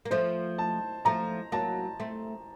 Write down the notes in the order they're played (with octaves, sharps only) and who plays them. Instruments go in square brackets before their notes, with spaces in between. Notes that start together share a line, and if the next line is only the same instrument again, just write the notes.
[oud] A#3
[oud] F3 A3 [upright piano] C5
[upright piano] A5
[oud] F3 A3 [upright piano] A#5
[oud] F#3 A#3 [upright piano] A5
[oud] A3 C4